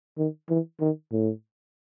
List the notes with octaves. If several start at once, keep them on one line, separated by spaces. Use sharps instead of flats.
D#3
E3
D#3
A2